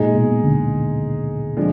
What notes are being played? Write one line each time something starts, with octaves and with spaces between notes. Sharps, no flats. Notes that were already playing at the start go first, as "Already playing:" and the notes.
Already playing: A#2 G#3 D#4 G#4
B2
D2 D3
F3 G#3 D4